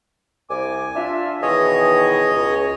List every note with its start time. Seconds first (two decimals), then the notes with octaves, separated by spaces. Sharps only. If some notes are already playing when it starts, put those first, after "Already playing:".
0.50 C2 G#5 D6
0.95 D4 F4 E5
1.42 B2 D#3 E3 G#4 C#5 D#5
2.31 C#2